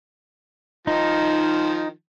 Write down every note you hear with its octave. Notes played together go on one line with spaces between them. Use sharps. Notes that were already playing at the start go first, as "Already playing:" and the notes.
D#3 F3 D#4